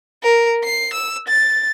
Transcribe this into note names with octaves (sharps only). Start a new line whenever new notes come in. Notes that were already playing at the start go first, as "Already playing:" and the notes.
A#4
C7
E6
A6